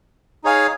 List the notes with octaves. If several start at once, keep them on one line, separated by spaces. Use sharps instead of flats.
D#4 G#4 C#5 F5 G#5